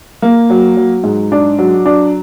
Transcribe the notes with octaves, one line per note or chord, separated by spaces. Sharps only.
A#3
F#3
F#3
G#2
D4
F#3
D4